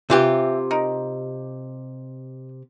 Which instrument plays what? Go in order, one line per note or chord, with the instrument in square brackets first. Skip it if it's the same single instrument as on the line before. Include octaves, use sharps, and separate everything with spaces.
[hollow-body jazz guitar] C3 F4 G4 [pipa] E3 C5 E5
[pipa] D#4 A#4